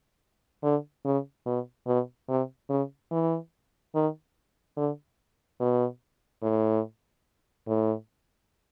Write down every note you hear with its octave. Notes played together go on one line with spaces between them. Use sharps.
D3
C#3
B2
B2
C3
C#3
E3
D#3
D3
B2
A2
A2